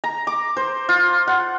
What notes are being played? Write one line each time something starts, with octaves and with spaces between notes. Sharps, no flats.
A#5
D6
C5
F4
F#5